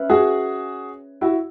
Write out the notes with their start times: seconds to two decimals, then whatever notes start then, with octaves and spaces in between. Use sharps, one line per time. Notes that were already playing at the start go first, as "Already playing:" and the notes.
Already playing: C#4 B4 E5
0.10 F#4 G#4
1.21 E4 F#4